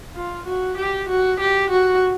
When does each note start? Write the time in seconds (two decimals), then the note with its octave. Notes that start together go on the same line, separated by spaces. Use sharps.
0.15 F4
0.46 F#4
0.77 G4
1.09 F#4
1.40 G4
1.70 F#4